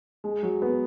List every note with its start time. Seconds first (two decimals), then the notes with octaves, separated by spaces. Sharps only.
0.24 G#3
0.43 F#3
0.62 B3